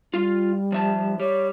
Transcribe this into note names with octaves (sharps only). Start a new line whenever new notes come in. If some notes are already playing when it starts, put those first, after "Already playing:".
G3 F4 F5
F3 E5 A5
G3 C#5